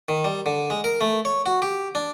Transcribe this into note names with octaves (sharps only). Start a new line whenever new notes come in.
D#3
G3
D3
G#3
A#4
A3
C#5
F#4
G4
D4